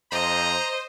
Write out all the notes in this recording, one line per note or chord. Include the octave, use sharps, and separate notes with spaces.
F2 C5 D#5 A#5